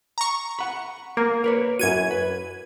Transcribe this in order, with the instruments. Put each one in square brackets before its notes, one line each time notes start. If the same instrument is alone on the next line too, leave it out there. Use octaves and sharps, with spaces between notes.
[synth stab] A#5 C#6
[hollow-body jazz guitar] F#5 B5
[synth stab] A#3 [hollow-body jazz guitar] A#4
[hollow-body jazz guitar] A#4 B4 C#5
[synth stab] F#2 G#6 D#7 [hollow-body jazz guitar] E4 F#4
[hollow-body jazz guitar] B4